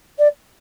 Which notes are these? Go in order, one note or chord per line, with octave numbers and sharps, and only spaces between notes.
D5